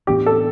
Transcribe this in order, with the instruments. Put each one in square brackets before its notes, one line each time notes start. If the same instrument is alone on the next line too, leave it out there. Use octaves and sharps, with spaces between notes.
[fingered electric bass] A2 E3 B3 D4 [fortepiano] G4
[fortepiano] A4